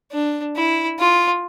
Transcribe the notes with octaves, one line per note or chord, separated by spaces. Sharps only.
D4
E4
F4